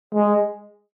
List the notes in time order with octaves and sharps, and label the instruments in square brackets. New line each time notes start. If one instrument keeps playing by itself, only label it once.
[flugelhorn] G#3